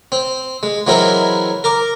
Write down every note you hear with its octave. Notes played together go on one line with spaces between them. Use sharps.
C4
G#3
E3 F#3 G#3 C4 E4 A#4
A#4 A#5 D6